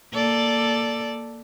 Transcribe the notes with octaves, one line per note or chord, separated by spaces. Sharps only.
A#3 A4 D5